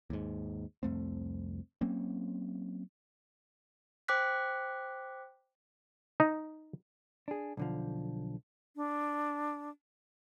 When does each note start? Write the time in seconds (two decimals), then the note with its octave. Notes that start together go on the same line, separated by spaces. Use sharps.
0.10 D#2 G#2
0.83 C2 F2 A3 C4
1.81 F#3 A#3 C4 C#4
4.08 C5 G5 D6 F#6 B6
6.20 D#4
7.28 D4 G#4
7.57 B1 D3 F3
8.75 D4